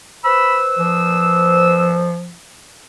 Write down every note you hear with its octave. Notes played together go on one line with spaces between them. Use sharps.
B4 C5 B5 E6
F3